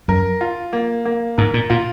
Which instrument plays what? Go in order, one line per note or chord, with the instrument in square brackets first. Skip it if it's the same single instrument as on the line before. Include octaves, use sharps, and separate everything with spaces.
[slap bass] F#2 [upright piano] A#4
[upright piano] F4
A#3
A#3
[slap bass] G#2 [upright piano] A#4
[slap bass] A#2
[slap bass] A#2 [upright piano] F4